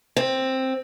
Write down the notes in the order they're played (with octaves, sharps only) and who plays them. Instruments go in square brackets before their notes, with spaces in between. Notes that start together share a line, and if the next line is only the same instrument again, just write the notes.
[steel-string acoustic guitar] C4